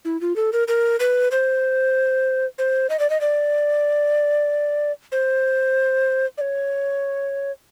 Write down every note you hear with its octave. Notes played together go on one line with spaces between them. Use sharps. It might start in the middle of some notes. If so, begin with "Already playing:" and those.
E4
F4
A4
A#4
A#4
B4
C5
C5
D#5
D5
D#5
D5
C5
D5
C#5